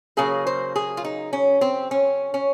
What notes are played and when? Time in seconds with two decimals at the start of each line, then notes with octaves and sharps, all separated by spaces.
0.17 C#3 F#3 A#3 G#4
0.47 C5
0.76 G#4
0.97 F4
1.05 D#4
1.33 C#4
1.61 C4
1.91 C#4
2.34 C#4